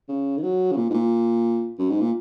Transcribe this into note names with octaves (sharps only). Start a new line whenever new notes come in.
C#3
D#3
F#3
C#3
A#2
G#2
A#2
F#2
G#2
A#2